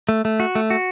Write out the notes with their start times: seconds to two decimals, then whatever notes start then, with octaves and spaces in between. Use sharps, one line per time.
0.09 A3
0.25 A3
0.40 F#4
0.55 A3
0.70 F#4